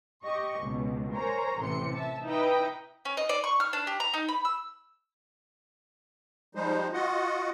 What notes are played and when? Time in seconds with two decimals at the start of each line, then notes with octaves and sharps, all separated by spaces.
0.23 G4 D#5 C#6
0.61 C#2 B2
1.14 A#4 C5 C#5 G#5 A#5
1.60 A1 A2 C3 E3 C6 C#7
1.93 E5 A5
2.24 D#4 E4 B4 D#5 G5
3.05 C#4
3.17 D#5
3.29 D5
3.44 C#6
3.60 F6
3.73 D4
3.87 G4
4.00 A#5
4.14 D#4
4.28 B5
4.45 E6
6.55 F3 G3 G#3 D#4 C5
6.93 F4 F#4 D#5 F#5